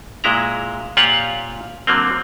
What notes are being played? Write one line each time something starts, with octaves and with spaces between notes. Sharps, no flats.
A#2 G#3 E4 A#5
A#2 F4 G4 C#5 F#5
D3 F#3 A#3 C4